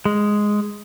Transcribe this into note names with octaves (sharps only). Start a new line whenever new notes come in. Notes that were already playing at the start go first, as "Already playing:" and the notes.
G#3